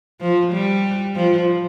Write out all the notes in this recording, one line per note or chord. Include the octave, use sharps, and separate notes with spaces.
F3
G3
F3